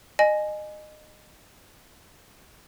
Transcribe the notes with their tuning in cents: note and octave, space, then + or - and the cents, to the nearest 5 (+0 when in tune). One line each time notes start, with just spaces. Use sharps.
D#5 -25 G#5 +10